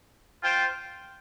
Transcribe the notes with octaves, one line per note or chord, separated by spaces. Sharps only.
F4 C5 G5